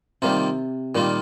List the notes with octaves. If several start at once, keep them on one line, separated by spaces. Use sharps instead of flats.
C3 D#3 G3 A#3 F4
A#2 D#3 G3 A#3 F4